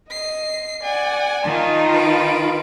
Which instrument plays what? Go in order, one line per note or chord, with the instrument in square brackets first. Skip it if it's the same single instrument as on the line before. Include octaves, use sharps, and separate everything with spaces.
[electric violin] D#5 [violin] C7
[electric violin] D5 F#5 [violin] G#5
[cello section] D#3 D#4 F4 [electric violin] A5 C6
[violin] B4 D7